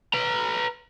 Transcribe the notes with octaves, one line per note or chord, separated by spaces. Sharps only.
B4 A#5